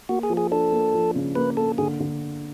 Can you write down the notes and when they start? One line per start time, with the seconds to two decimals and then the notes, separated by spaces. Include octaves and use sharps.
0.09 A#3 F#4
0.23 G#4
0.30 F3
0.37 G#4
0.51 D4 A4
0.72 A#3
0.94 F3
1.15 C#3
1.35 A#3 B4
1.57 A#3 A4
1.78 D3 G#4
2.00 D3